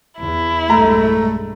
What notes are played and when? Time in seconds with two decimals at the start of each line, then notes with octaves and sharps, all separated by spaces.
0.20 E2 E4
0.70 B1 G2 G#3 A3 A#5